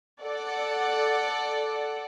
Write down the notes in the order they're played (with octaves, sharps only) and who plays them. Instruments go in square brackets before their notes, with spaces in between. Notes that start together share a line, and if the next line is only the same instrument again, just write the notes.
[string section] A4 D5 F#5